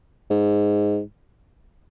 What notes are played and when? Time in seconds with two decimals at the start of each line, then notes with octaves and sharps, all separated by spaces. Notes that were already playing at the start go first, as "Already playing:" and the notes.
0.30 G#2